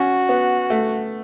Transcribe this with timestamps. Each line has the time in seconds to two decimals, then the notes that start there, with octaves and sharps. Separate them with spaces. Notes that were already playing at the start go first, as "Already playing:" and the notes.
Already playing: C#4 F#4
0.29 B3
0.70 A3